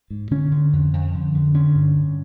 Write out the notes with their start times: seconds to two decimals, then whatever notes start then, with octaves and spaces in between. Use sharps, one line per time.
0.10 G#2
0.31 D3 C#4
0.51 D3
0.73 F2
0.93 F2
1.14 D3
1.34 D3
1.54 D3 C#4
1.75 G2
1.97 G2